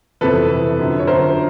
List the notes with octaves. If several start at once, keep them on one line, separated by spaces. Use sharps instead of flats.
F2 C3 E3 A4 B4
F2 C3 E3
F#2 D3 F3
C#5
F#2 D3 F3 A#4 C5